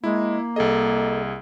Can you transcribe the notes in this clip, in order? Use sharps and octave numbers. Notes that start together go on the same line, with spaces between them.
G#3 A#3 E4
C2 G#4 A4 D#5